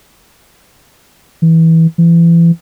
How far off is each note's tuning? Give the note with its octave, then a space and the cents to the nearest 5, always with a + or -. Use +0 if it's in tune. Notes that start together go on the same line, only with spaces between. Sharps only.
E3 -20
E3 +30